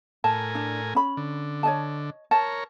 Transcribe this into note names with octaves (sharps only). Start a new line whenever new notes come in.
A2 A#4 G#5 A5
D4
C#4 B5
D3
C#5 D#5 A5
A#4 C#5 A5